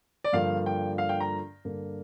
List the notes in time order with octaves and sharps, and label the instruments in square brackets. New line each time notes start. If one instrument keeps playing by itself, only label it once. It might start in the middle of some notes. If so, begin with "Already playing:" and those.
[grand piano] D5
G2 D3 F3 A#3 F5
G5
F5
G5
A#5
G2 D3 A#3 D4